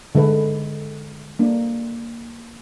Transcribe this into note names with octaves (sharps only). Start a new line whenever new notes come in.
D3 G#3 A4 B4
A#3 D4